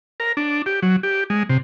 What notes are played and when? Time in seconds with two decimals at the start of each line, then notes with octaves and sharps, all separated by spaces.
0.20 A#4
0.37 D4
0.66 G4
0.82 F#3
1.03 G4
1.30 G#3
1.49 C3